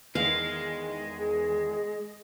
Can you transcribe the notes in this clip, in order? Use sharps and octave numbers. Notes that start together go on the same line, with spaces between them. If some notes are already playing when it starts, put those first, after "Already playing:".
E2 D#3 G#3 F5
G#4